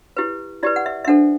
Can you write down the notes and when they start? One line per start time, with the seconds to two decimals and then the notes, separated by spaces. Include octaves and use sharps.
0.17 E4 G4 B4
0.63 E4 G4 B4 D5
0.76 F#5
0.86 E5
1.05 E5
1.07 D4 A4 C5 F#5